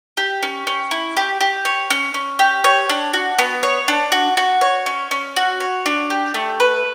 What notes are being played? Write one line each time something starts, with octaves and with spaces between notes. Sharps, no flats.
G4
C#4
C#4
E4
G4
G4
C#5
C#4
C#4
G4
C#5
D4
F#4
B3
C#5
D4
F#4
F#4
C#5
C#4
C#4
F#4
C#5
D4
G4
A3
B4